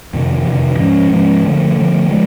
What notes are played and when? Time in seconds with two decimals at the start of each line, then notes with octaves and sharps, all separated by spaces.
0.13 F2 C3 D#3
0.46 F2 C3 D#3
0.78 G#2 F3 G#3 C#4
1.11 G#2 F3 G#3 C#4
1.44 D3 F3 A3
1.76 D3 F3 A3
2.09 F3 G#3